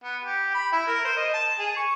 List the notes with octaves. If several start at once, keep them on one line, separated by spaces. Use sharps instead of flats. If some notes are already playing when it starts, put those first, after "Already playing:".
B3
G4
B5
E4
A#4
C5
D#5
A5
G#4
C#6